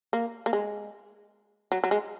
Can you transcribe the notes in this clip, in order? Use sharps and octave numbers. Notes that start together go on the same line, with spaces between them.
A#3
A#3
G#3
F#3
F#3
G#3